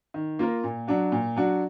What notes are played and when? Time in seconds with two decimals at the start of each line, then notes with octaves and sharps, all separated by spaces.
0.14 D#3
0.39 A#3 F4 A#4
0.64 A#2
0.87 F#3 D4 F#4
1.12 A#2
1.36 F#3 D4 F#4